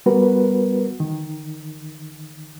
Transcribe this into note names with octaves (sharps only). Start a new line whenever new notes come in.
G3 B3 F#4 A#4 B4
D#3